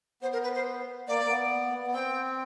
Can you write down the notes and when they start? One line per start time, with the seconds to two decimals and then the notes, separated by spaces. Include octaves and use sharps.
0.22 B3 C5
0.33 A#4
0.43 B4
0.54 C5
1.08 A#3 D5
1.25 A#3
1.29 B3
1.87 B3
1.94 C4 G5